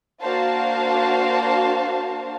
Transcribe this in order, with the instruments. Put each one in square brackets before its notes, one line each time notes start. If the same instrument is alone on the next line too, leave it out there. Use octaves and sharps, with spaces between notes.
[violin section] A#3 D4 F#4 C5 F5 A5